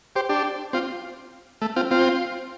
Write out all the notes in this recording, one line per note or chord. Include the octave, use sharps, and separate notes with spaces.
G4 C5
D4 G4
C4 F4
A3
C4 F4
C4 F4